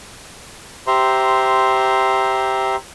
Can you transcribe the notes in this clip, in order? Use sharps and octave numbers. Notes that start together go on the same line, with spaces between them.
G4 C5 E5 A#5 C6